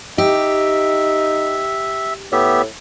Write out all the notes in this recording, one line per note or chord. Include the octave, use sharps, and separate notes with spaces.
D#4 G4 E5
A2 B3 G4 E5